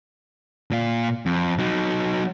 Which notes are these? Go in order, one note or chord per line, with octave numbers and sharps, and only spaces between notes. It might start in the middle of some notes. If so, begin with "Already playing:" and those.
A#2 F5
F2
F#3 D#4